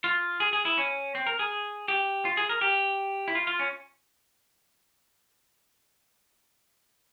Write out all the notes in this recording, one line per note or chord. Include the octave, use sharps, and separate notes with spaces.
F4
G#4
G#4
E4
C#4
C4
A#4
G#4
G4
F4
G#4
A#4
G4
E4
F4
F4
C#4